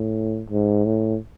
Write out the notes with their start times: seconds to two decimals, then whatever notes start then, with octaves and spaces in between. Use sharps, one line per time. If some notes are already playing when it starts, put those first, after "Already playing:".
Already playing: A2
0.50 G#2
0.86 A2